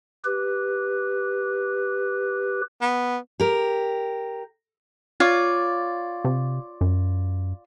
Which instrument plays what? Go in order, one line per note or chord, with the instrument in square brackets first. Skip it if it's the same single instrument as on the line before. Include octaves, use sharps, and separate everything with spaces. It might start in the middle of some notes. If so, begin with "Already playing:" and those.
[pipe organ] G4 B4
[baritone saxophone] B3
[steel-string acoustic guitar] G4 A#4
[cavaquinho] F4 C#5 D5
[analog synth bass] C3
F#2